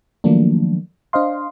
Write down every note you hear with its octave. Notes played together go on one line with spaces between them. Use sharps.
D#3 F3 F#3 A3 A#3 D4
D4 C5 D#5 F5 C6